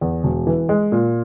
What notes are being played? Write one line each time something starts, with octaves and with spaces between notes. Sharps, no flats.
E2
E1
E3
G#3
A#2